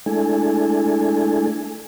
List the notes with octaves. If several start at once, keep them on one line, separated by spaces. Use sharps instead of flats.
G#3 A3 D4 E4 A4 G#5